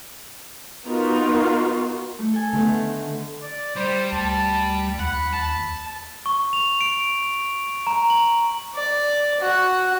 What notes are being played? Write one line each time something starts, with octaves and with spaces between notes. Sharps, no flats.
B3 D#4 F4 F#4 A#4
A3
A4 G#5
D3 D#3 A3 B3
D5
G3 C5
D2 A5
D#2 F#5 B5
A5
C#6
F7
D7
A#5
F#7
D5
F#4 F#5